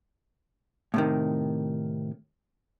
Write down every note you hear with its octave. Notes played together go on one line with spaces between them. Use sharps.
A2 C3 D#3